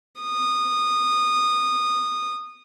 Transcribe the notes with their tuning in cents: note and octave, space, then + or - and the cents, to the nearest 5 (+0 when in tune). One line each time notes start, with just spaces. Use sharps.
D#6 -20